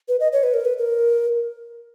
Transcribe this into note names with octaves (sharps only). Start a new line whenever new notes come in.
B4
D#5
C#5
B4
A#4
B4
A#4